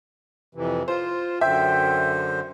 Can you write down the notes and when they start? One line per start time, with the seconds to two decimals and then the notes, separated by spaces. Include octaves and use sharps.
0.55 F2 C3 E3
0.88 F4 C5
1.41 F#2 D3 C5 E5 G5